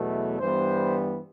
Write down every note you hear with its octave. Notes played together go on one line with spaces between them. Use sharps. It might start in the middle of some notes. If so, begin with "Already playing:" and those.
Already playing: E2 B2 F#3 A3
G2 E3 G3 B3 C5